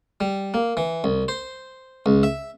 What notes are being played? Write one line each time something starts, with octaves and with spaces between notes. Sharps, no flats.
G3
A#3
E3
C2
C5
C#2
E5